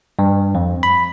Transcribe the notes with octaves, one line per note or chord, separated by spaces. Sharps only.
G2
F2
B5